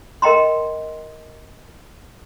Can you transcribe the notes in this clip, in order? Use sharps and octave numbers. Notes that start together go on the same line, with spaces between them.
A#4 D#5 G5 A#5 C6